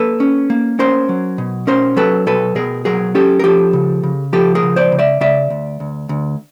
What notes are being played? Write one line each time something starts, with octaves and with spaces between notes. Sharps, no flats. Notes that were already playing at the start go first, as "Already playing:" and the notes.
Already playing: A#3 A4 B4
C#4
A#3
C#4 A#4 C5
F#3
B2
C#4 A#4 C5
F#3 A4 B4
B2 A4 B4
B2 G#4 A#4
F#3 G#4 A#4
C#4 G4 A4
A#4
F3 G4 A4
C#3
C#3
F3 G4 A4
G#4 A#4
C#3
C5 D5
C#3
D5 E5
C#3 D5 E5
D2
D2
D2